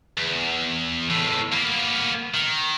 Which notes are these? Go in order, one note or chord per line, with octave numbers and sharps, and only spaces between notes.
E2
C#2 A2
A#3 B3
D#3